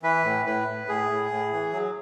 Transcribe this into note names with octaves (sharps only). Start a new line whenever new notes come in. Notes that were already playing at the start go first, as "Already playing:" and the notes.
E3 B4
A2
A2 B4
A2
A2 G#4
A2
A2
E3
F#3